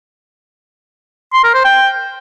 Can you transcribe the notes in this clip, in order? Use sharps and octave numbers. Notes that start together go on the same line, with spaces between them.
C6
A#4
C5
G5